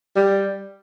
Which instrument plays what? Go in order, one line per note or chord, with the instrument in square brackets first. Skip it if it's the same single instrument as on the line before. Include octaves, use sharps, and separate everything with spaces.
[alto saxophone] G3